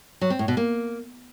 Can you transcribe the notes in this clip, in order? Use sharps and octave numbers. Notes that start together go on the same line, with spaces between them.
F#3
C4
A2
B2
A#3